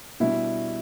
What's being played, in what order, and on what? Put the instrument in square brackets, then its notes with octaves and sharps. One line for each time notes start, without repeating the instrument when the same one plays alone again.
[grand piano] B2 G3 D4 [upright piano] E4